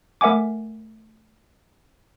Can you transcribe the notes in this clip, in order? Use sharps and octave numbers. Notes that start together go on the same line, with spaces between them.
A3 A#4 E5 F#5 G#5 D6